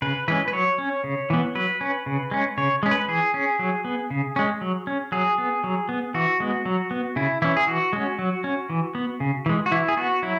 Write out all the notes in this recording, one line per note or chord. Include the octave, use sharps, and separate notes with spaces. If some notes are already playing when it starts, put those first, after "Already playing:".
C#3 B4
E3 G#3 C#4 B4
B4
F#3 C#5
C#4
C#3
E3 B3
F#3 B4
C#4
C#3
G#3 C#4
C#3 C#5
G#3 C#4
B4
E3 G#4
C#4
F#3
B3
C#3
G#3 C#4
F#3
C#4
F#3 G#4
B3
F#3
B3
E3 F#4
G#3 B3
F#3
B3
C#3 E4
E3 C#4 E4
G#4
E3 F#4
G#3 C#4
F#3
C#4
E3
B3
C#3
E3 G#3
F#4
E3 E4
G#4
B3 F#4
F#3 E4